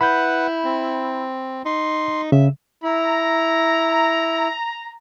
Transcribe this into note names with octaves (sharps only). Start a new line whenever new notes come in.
E4 B4 F#5 B5 G6
C4
D#4 C6
C#3 E5
E4 A#5